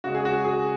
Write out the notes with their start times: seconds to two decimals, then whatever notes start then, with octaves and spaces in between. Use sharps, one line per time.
0.04 C#3 G#3 F#4
0.15 G#4
0.25 F#4
0.45 G#4